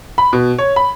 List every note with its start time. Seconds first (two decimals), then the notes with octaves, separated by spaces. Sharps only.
0.18 B5
0.33 B2
0.59 C#5
0.76 B5